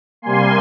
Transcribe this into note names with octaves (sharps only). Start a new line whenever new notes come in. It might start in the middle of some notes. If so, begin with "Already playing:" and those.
C3 G3 A#3 G#5 C6